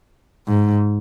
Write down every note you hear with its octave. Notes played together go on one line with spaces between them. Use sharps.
G#2